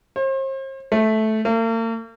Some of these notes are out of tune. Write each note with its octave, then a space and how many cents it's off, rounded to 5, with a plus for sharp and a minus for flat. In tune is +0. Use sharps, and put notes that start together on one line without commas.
C5 +40
A3 -10
A#3 -45